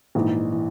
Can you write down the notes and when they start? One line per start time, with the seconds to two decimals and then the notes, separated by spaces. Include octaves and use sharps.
0.15 A#1 G#2 E3
0.52 E3